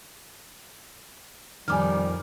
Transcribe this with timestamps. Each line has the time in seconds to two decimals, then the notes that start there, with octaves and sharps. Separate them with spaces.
1.68 F2 A#2 D#3 G3 G#5 D6 F6